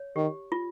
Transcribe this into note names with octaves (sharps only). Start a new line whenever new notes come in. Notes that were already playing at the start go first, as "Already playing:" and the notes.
Already playing: C#5
D#3 G4
F4